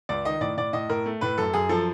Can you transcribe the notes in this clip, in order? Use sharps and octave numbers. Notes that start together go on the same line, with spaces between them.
C#2 D5
D#3 D#5
A2 D5
A2 D5
A2 D#5
A2 A#4
A3
A2 B4
F#2 A4
F#2 G#4
F3 A4